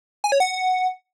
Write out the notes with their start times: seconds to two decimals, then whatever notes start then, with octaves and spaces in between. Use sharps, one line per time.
0.24 G#5
0.32 C#5
0.40 F#5